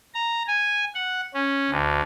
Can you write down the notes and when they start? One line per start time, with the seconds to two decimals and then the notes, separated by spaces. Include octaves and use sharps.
0.14 A#5
0.47 G#5
0.95 F#5
1.34 C#4
1.70 D2